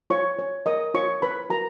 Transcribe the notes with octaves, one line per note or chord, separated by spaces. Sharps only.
F4 C#5 C#6
C#5
A#4 D#5 D#6
F4 C#5 C#6
B4 B5
F#4 A#4 A#5